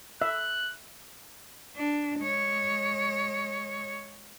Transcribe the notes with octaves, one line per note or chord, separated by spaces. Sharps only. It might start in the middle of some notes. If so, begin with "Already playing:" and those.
E5 F#6
D4
G#3 C#5